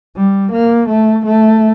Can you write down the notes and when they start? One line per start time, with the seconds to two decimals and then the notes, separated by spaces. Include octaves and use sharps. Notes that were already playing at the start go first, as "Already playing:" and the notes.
0.16 G3
0.52 A#3
0.89 A3
1.26 A3